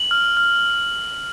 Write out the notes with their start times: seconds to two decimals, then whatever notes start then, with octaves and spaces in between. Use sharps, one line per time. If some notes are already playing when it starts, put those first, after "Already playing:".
Already playing: F#7
0.11 F6
0.37 F6